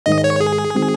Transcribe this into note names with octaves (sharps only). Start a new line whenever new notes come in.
G#2 D#3 G#3 D#4 D#5
C#5
G#4
D#3 G#3 C4 F#4